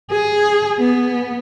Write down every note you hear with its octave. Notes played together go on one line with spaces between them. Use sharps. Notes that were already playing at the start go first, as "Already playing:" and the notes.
G#4
B3